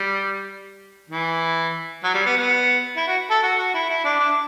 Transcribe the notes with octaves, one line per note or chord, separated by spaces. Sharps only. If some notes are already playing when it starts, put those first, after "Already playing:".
Already playing: G3
E3
F#3
G3
B3
B3
E4
F#4
A4
F#4
F#4
E4
E4
D4
D4